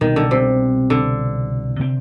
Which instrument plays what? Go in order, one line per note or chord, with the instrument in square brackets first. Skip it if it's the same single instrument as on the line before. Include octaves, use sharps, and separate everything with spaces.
[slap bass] C2 B2 B3 [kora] D#3
[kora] D3
C3
D3
[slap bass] C3 G3 C4